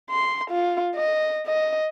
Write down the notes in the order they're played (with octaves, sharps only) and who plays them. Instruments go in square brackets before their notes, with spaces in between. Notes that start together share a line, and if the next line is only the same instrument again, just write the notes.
[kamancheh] C6
F4
D#5
D#5